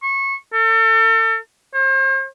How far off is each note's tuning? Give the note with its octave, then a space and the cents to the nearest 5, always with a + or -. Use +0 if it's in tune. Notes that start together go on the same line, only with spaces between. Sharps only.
C#6 -20
A4 +35
C5 +40